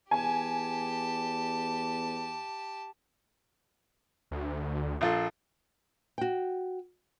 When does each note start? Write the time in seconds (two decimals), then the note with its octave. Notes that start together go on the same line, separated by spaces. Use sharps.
0.11 E2 G4 G#5 A5
4.31 D2
5.01 A#1 F4 A4
6.18 F#4 G5